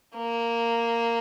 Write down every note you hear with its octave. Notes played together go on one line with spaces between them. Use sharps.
A#3